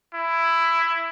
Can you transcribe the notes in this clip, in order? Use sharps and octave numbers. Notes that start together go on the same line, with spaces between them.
E4